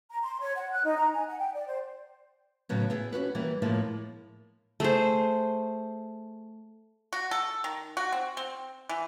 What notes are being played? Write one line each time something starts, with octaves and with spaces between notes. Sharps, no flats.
A#5
C6
C#5
F#5
F#6
D#4
A#5
G#5
F#5
G5
D5
C5
A2 C#3 F#3 B3
B3 E4 G#4
C#4 D4 F#4 B4
E3 G3 A#3
A2 F3 G#3 A#3 E4
A3 G#4 C5
F#4
A4
D#3
F#4
C4
C4
E3